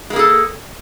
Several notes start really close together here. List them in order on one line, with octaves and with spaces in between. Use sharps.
G#3 A#3 G#4 A4